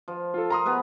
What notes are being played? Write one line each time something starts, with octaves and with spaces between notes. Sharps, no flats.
F3
F4 A4
A#4 A#5 C6 D#6
B3 G#4 B4